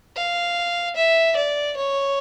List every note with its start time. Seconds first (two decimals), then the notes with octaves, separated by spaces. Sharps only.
0.16 F5
0.96 E5
1.37 D5
1.77 C#5